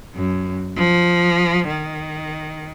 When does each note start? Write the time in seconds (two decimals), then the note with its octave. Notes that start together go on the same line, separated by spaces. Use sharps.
0.15 F#2
0.77 F3
1.68 D#3